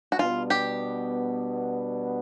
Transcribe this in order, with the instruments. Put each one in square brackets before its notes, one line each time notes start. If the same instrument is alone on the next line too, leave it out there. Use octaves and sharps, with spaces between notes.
[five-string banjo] F#4
[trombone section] B2 G3 B3 D4 [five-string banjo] F4
[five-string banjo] G4